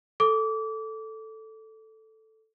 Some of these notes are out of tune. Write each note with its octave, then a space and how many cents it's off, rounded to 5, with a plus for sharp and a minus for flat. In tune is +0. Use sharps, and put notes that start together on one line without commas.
A4 +0 D6 -25